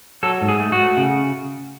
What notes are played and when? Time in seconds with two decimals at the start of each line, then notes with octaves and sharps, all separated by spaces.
0.23 F#3 A4
0.42 G#2
0.48 G#4
0.60 A3
0.72 F#4
0.79 A3
0.97 C#3